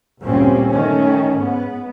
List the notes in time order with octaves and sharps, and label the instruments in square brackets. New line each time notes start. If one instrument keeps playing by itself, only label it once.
[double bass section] D2 G2 A#2 G3 C4 C#4
D#3 A3 C#4
G#2 B3